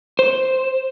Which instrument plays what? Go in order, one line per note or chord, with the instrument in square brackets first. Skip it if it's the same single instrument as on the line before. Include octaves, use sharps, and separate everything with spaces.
[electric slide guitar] C5